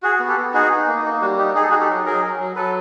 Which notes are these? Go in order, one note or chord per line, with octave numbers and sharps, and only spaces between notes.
F#4 G#4
B3
G4 A4
B3
D#4 F#4 G#4
D#4
A#3
A#3
G3 F#4
D#4 G4
D#4 G#4
A4
D#4 F#4 G#4
G4 A4
F#3
F#3 G#4 A#4
F#3
F#3
F#3 A4 B4